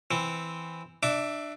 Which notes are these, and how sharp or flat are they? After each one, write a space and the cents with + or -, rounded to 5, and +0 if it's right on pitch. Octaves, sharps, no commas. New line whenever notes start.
E3 +0 C4 +0
D4 +20 E5 +0 D6 -15